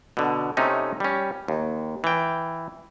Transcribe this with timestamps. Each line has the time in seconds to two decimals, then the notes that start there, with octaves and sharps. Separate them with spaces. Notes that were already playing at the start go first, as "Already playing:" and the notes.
0.17 B2 D3
0.57 C3 A3 C#4 D#4
1.00 G3 C#4
1.48 D#2
2.04 E3 G5